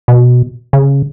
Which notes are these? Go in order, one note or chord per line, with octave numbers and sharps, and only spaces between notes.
B2
C#3